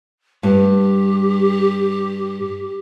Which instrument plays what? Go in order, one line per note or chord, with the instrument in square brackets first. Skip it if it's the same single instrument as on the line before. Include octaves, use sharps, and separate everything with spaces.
[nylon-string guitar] G2 [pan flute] G4